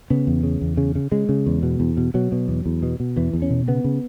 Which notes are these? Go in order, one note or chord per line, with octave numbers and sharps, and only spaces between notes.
C#3 B3
E2
C#3
E2
C#3
C#3
C#3 G#3
C#3
E2
B2
E2
B2
B2 F#3
B2
E2
E2
B2
B2
E2 E3
E2
C#4
B2
C#3 B3
C#3